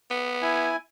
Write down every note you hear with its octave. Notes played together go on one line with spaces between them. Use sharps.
B3
E4 G#5